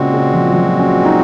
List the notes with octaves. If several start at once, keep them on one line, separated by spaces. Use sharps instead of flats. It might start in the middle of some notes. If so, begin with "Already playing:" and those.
Already playing: A#2 C#3 G#3 C4 F#4
C#3
F3
F#3
C#4
D#4